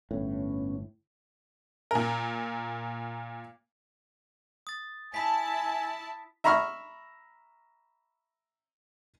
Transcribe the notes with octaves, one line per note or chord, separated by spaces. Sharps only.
G1 A2 B3 C#4
A#2 A#4
D#6 A6
E4 G#5 A5 B5 B6
E5 A#5 B5 C#6 E6 F6